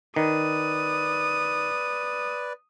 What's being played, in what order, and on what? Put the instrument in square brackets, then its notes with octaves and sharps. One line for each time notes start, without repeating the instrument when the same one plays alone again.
[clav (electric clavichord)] D#3 [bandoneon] B4 D5 [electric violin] D#6